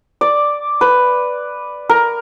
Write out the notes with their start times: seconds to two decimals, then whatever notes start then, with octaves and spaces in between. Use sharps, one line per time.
0.21 D5
0.81 B4
1.89 A#4